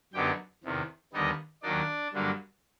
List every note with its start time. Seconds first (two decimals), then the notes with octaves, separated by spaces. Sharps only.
0.14 F#2 D3 F#3 B3 D#4 G4 G5
0.64 E2 C3 D#3
1.13 D#2 D3 G3 B3 D#4 D#5
1.63 D#2 D#3 F#3 A#3 D4 D#4 D5
2.13 G2 D3 F#3 A#3 D4